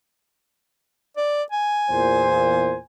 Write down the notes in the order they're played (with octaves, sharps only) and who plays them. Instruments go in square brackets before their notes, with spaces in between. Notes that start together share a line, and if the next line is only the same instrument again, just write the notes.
[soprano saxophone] D5
G#5
[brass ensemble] E2 A#2 C5